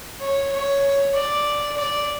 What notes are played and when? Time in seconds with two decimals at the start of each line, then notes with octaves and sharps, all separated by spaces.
0.21 C#5
0.52 C#5
1.15 D5
1.77 D5